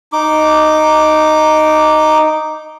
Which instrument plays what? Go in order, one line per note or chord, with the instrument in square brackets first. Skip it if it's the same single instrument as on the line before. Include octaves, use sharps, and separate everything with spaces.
[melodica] D#4 D6